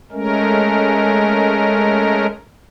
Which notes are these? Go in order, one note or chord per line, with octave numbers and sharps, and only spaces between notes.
G#3 A3 C#4 A#4